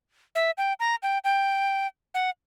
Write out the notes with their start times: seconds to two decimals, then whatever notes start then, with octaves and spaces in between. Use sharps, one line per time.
0.35 E5
0.58 G5
0.80 A#5
1.03 G5
1.24 G5
2.14 F#5